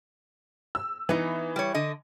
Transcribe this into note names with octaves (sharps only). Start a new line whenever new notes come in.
E6
E3 B3 D#4
G3 C#5
D3 D#5